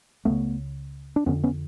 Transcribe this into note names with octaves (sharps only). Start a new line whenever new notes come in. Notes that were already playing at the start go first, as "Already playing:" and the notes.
C#2 C#3 A3 B3
D4
F2 D3 B3 C#4
B3 C#4